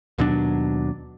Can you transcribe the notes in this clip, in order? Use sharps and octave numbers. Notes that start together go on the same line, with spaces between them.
D#2 B2 F#3 D4